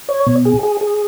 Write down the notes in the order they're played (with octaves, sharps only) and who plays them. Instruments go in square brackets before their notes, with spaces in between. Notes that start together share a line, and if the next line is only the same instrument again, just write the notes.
[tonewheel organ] C#5
B2
G#4
G#4
G#4